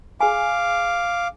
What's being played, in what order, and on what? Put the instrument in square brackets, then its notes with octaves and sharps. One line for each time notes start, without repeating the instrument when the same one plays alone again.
[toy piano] G#4 G#5 [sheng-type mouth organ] F5 D6